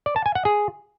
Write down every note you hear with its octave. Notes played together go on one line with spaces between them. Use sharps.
D5
A5
G#5
F#5
G#4